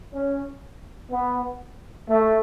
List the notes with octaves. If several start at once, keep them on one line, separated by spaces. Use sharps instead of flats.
C#4
B3
A3